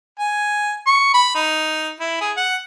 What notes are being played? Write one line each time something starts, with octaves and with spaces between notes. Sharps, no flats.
G#5
C#6
B5
D#4
E4
G#4
F#5